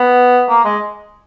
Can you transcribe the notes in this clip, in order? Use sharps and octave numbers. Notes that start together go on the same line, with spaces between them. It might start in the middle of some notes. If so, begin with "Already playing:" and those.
Already playing: B3
A#3
G#3